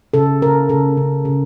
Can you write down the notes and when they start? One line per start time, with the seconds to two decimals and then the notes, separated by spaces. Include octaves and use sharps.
0.14 C#3 A4
0.42 C#3 A#4
0.69 C#3 A4
0.97 C#3
1.25 C#3